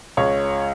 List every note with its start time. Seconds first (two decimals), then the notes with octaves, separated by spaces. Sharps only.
0.17 C#2 C#5